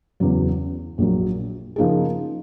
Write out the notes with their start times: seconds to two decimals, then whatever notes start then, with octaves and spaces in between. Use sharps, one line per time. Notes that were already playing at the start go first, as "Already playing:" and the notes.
0.20 E2 C#3 F#3
0.98 A#1 A#2 F#3
1.76 C#3 F3 A#3 D#4 G#4